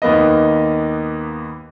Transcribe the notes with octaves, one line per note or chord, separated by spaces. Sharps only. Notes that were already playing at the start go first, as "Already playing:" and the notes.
D#2 A#3 B3 D#5